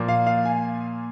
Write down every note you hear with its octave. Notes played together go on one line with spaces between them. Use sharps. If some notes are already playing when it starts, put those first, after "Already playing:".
Already playing: A#2 F3 A#3
F5
F5
G#5